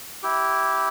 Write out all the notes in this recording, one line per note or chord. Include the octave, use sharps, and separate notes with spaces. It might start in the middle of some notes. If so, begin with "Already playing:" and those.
E4 G4